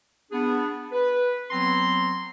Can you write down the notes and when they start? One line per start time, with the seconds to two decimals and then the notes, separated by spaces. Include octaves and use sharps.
0.32 B3 D4 G#4
0.92 B4
1.51 F#3 B3 C4 A#5 C6